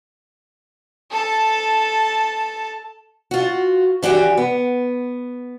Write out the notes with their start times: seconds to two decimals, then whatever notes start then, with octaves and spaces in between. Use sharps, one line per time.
1.11 A4 A5
3.31 F4 F#4
4.02 E3 D4 F#4 G4
4.38 B3